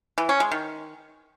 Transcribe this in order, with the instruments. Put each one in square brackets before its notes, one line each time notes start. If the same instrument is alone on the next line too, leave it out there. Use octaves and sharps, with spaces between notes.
[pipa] E3
C#4
G#3
D#3